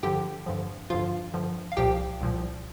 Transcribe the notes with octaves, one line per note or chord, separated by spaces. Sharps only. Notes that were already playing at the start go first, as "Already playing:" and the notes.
G2 D3 F3 G4 G5
G2 D3 F3
G2 D3 F3 F4 F5
G2 D3 F3
F5
C2 A#2 F3 G4 G5
C2 A#2 F3